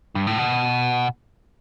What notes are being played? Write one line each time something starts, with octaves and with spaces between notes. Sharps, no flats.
G2
A2
B2